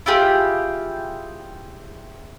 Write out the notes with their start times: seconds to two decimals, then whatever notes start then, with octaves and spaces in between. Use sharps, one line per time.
0.06 E4 F4 G4 G#4